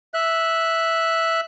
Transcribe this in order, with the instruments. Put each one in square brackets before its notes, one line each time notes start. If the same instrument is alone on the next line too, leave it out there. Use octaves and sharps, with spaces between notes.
[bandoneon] E5 F#6